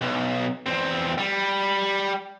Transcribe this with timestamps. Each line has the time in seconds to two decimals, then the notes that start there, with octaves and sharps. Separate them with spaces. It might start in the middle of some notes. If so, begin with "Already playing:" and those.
0.01 B1
0.66 E2 C4
1.18 G3